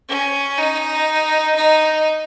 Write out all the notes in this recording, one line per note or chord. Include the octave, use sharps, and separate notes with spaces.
C#4
D#4
D#4